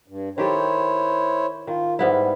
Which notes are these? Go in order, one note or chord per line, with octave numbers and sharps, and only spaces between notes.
G2
D#3 E4 G4 A4 C5 C#5
D#3 F4
G#2 G3 B3 E4